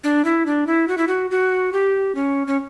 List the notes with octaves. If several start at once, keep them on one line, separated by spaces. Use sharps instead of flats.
D4
E4
D4
E4
F#4
E4
F#4
F#4
G4
C#4
C#4